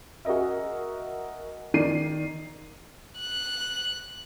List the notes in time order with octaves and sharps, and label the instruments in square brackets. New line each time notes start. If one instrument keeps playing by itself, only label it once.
[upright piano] F#4 G#4 A#4 D#5 E5
D#3 D5 C7 D#7
[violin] F#6